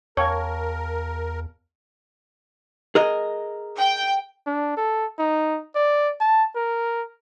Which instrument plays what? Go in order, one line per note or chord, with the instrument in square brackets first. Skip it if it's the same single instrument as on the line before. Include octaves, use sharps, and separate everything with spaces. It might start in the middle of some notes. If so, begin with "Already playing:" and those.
[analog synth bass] E2 [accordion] A#4 [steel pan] C#5 [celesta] F5 G5 A5
[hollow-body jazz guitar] G#4 A#4 D#5
[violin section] G5
[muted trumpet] D4
A4
D#4
D5
A5
A#4